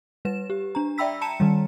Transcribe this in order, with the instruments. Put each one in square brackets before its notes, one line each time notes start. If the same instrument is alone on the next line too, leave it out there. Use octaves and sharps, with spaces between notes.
[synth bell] G3 B4 E7
G4
D4 A#5
D5 E5 G5 B5 E6 B6
A5 A#5 C#7 E7
D#3 G3